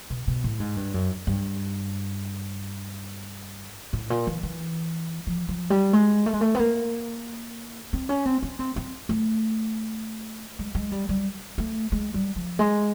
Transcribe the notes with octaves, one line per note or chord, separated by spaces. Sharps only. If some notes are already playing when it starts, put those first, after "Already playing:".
B2
B2
A2
G#2
G2
F#2
G2
A2
A#2
E3
E3
F3
F3
G3
G#3
A3
G#3
A3
B3
A#3
C4
C#4
C4
C#4
C4
C4
A3
G#3
G#3
G3
G3
A3
G#3
G3
F3
G#3